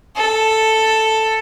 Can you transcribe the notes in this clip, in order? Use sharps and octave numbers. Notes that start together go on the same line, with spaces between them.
A4